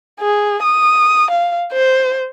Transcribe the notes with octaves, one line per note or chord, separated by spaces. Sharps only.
G#4
D#6
F5
C5